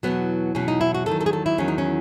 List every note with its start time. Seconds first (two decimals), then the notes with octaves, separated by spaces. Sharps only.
0.03 E2 B2 F#3 B3
0.55 E2 B2 F#3 C#4
0.68 D#4
0.81 E4
0.94 F#4
1.06 E2 D#3 F#3 A4
1.21 A4
1.26 G#4
1.33 A4
1.46 E4
1.58 E2 D#3 F#3 C#4
1.68 D#4
1.78 C#4